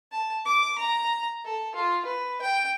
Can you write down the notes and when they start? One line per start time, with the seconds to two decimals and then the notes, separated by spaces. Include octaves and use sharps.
0.12 A5
0.46 D6
0.78 A#5
1.45 A4
1.75 F4
2.05 B4
2.41 G5